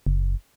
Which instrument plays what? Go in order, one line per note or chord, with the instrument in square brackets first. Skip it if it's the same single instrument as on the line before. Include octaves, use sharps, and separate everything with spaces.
[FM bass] F#1